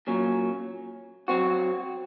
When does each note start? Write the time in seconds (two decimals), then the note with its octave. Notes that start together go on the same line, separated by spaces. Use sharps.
0.07 A#2 F#3 C#4
1.28 F#3 C4 F#4